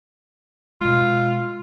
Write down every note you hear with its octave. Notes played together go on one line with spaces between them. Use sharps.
B2 G#3 F4